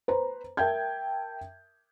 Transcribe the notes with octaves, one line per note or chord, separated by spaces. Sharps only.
B4 C5 A#5
A#4 E5 G5 A5 G6 G#6